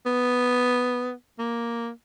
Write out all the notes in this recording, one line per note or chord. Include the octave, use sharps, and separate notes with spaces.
B3
A#3